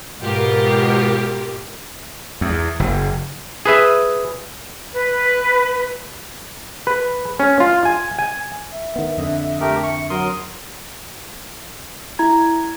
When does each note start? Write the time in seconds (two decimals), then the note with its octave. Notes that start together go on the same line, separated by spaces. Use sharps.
0.21 G#2 B2 F4 G4 A#4
2.41 E2
2.80 F#1
3.66 G#4 B4 E5
4.92 B4
6.87 B4
7.40 C#4
7.60 F4
7.85 G#5
8.19 G#5
8.72 E5
8.96 D#3 B3
9.17 F2 D3 D#5
9.60 A3 G4 A#4
9.83 C#6
10.10 F#3 A#4 C6 D#6
12.19 E4 A#5 G#6